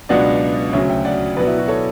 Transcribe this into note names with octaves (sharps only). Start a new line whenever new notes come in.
C#2 B2 F#3 B3 D4 D5 F#5
D2 C#3 F#3 C#5 E5
E5 G5
D5 F#5
B2 F#3 B3 B4 D5
E4
F#4
A4 C#5